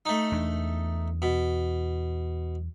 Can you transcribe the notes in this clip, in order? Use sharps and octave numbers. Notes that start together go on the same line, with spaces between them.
A3 D#4
E2 D4
B2